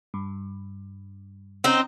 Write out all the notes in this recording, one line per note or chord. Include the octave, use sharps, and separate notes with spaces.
G2
C4 C#4 D#4